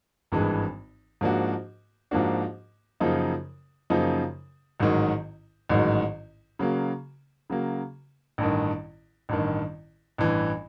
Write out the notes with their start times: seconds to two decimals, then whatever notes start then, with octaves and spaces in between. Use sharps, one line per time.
0.32 G#1 G2 E3 G#3
1.21 G#2 F3 A#3 D4 F#4
2.11 G#2 F3 A#3 D4 F#4
3.00 F#2 C#3 F3 A#3 D#4
3.90 F#2 C#3 F3 A#3 D#4
4.80 A1 G#2 D#3 F#3
5.69 A1 G#2 D#3 F#3
6.59 C#3 F#3 A#3
7.50 C#3 F#3 A#3
8.38 A1 G2 D#3
9.29 A1 G2 D#3
10.18 A1 G2 E3